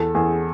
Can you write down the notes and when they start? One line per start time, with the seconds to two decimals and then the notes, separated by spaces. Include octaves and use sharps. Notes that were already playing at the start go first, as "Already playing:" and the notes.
Already playing: E2 A4
0.15 E2 G#4